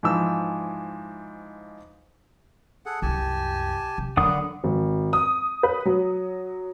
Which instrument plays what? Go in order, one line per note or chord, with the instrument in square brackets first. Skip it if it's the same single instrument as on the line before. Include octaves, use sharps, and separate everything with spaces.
[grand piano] G#2 E3 F3 E6
[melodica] G#4 A4 F#5
[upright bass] C2 F#2 [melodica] G4 G#5 A5
[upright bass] C3
[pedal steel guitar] D3 F#5 D#6 [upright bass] F#3 C#4 [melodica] A#3 B3
[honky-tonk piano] G#1
D#6
B4
F#3